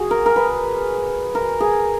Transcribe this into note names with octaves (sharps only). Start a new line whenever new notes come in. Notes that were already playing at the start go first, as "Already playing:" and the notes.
Already playing: F#4 G#4
A#4
A#4
B4
A#4
G#4